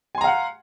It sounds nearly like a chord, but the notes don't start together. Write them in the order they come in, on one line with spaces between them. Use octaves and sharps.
G#5 C6 A#5 F5 F#5